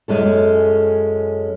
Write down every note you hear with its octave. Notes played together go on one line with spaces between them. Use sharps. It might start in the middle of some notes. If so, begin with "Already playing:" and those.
F#2 G#3 C#4 A4